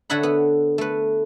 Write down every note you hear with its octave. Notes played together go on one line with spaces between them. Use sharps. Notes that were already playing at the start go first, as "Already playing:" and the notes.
D3 A4 C#5 E5 F#5 B5
B3
A3 B4